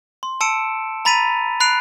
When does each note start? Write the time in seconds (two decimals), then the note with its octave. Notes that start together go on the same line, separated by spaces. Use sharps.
0.23 C6
0.41 A5 E6 C#7 D7 E7
1.05 A#5 B5 A6 B6 D#7 F7
1.60 B5 F#6 C7 D7 F7